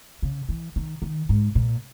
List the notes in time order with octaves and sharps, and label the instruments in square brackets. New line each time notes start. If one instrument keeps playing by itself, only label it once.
[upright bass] C#3
E3
D#3
D#3
G#2
A#2